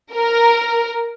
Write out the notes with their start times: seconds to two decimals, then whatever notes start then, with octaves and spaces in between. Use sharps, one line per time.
0.14 A#4